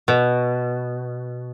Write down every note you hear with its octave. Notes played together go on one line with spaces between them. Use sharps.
B2